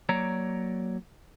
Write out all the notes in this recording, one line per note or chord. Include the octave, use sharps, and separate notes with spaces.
F#3 A#3 C#5 D5 A#5